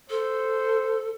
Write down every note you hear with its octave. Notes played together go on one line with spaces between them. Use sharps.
A4 C5